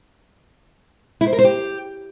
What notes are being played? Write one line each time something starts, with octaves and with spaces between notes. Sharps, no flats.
E4
C5
A#4
C5
G4